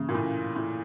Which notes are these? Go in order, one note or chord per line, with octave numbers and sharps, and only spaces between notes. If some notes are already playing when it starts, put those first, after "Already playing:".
Already playing: G2 C#3 E3 A#3 C#4
A#2
A2
A2